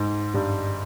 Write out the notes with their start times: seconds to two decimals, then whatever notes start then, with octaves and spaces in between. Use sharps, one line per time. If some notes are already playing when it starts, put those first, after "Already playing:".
Already playing: G#2
0.34 G2